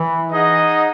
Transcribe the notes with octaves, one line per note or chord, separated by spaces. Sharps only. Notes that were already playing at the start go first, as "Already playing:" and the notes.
Already playing: E3
D#4 G#4 D#5 F#5